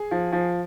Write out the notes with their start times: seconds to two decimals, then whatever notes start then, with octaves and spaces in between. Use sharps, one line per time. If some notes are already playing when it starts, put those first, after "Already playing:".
Already playing: G#4
0.11 F3
0.33 F3